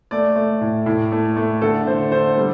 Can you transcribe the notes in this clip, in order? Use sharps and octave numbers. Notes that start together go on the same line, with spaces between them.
A3 D5
A3
A2
A2
A3
A3
D3 A4
D3 C5
D3 C5
G3 A4